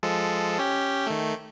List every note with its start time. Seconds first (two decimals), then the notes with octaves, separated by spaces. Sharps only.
0.03 F3 G#3 A4
0.59 C#4 G4 G5
1.07 D#3 A3